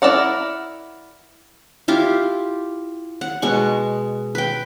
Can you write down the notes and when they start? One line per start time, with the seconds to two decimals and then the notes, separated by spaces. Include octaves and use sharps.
0.02 E4 A#4 D5 F#5
1.88 E4 F4 G4
3.21 F#5
3.42 B2 G#3 C#6
4.35 B4 G5